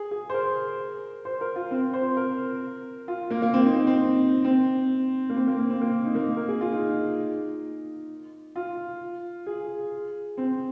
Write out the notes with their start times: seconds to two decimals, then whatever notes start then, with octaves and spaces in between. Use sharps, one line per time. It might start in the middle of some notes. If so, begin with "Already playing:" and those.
Already playing: G#4
0.11 G#4
0.30 C5
0.34 A#4
1.25 C5
1.41 A#4
1.56 F4
1.71 C4
1.93 C5
2.17 A#4
3.08 F4
3.31 A#3
3.42 A#3
3.53 C4
3.65 D#4
3.76 C4
3.87 C4
4.44 C4
5.30 A#3
5.37 C4
5.48 A#3
5.59 A#3
5.70 C4
5.81 A#3
6.05 D#4
6.15 A#3
6.37 A#4
6.48 G#4
6.61 F4
6.72 D#4
8.56 F4
9.46 G#4
10.38 C4